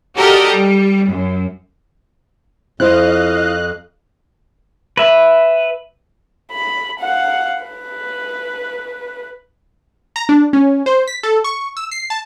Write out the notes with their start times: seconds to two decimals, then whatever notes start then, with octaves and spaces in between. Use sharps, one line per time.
0.16 F#4 G4 A4 A#4 D5 D#5
0.48 G3
1.09 F#2
2.80 F2 E4 F4 C5 D#5 F5 F#6
4.97 B4 E5
6.52 B5
7.00 F5 F#5
7.63 B4
10.16 A#5
10.29 D4
10.53 C#4
10.86 C5
11.07 B6
11.23 A4
11.44 C#6
11.77 E6
11.91 C7
12.10 A5